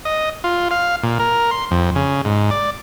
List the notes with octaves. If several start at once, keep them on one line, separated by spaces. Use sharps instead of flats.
D#5
F4
F5
A#2
A#4
C6
F2
C#3
G#2
D5